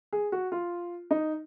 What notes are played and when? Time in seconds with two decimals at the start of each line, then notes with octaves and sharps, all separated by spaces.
0.13 G#4
0.32 F#4
0.52 F4
1.11 D#4